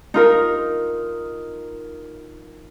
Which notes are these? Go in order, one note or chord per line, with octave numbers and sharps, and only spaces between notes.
D#4 F4 A#4